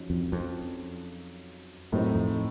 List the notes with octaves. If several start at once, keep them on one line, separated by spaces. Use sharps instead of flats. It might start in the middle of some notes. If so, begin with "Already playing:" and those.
Already playing: F#2 C#3 F3 D#4
F2
F2
F#2 A2 A3 C4 D#4
F2